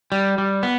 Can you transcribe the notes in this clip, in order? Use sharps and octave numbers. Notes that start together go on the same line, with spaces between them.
G3
G3
B3